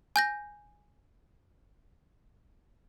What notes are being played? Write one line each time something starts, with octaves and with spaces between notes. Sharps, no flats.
G#5 G6 A#6